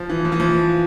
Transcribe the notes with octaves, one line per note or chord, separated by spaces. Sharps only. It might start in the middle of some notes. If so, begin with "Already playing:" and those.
Already playing: F3
E3
F3
E3
F3